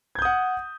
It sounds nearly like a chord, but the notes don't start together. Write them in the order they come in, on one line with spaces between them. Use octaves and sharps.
G#6 G6 D#6 F#5